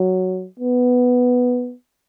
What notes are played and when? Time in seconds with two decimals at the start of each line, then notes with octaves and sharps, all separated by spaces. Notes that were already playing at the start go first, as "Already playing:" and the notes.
Already playing: F#3
0.60 B3